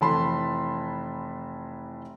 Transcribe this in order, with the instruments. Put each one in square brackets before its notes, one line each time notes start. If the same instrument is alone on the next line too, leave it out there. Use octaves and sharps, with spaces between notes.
[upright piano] F1 E3 A5 B5 C6